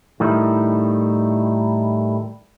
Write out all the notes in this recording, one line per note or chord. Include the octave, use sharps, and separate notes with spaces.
A2 D#3 G3 D#4 E4